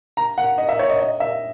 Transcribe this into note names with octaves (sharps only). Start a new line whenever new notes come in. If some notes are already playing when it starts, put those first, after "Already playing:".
A#5
F#5
D#5
E5
C#5
D#5
D#5
E5